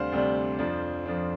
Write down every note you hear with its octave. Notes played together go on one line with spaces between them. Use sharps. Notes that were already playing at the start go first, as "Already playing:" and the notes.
Already playing: D2 C3 G3 D4 C5 F5
D2 C3 G3 D4
F2 F3 D4
F2 F3 D4